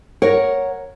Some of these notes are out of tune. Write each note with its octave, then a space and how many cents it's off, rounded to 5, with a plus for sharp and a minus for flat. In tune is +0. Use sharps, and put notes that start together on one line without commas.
A#4 +0 C#5 +0 F#5 +0